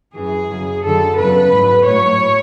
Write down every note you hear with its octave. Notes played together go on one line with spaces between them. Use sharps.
F#2 E3 G#4
F#2 C#3 F#3
F#2 D3 F#3 A4
E2 C#3 F#3 B4
G#2 F#3
A2 F#3 C#5